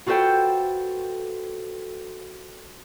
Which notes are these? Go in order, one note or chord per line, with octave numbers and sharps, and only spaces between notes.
F4 F#4 A4 B4 C5 G5